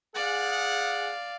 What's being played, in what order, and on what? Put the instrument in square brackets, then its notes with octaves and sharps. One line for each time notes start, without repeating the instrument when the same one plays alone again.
[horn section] G#4 F#5 [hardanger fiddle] D5 F5